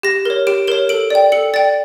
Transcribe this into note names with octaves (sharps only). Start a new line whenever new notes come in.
G4 A#6
A#4 C#5
G4 D7
A#4 C#5 E7
A4 D7
D5 G5
A4 C#7
D5 G5 A6